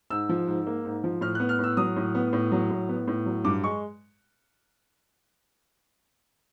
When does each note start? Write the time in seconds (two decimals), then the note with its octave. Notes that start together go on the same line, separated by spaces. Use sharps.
0.10 G#2 E6
0.29 F3
0.47 G#2
0.67 A#3
0.85 G#2
1.04 F3
1.21 A2 F6
1.35 B3 F#6
1.49 F6
1.59 A2 E6
1.77 F#3 D#6
1.96 A2
2.15 B3
2.33 A2
2.52 F#3
2.71 A2
2.89 B3
3.08 A2
3.26 F#3
3.44 G2 D6
3.63 G#3 C#6